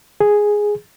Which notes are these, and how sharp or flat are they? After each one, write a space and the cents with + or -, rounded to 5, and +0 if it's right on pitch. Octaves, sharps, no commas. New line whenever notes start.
G#4 +0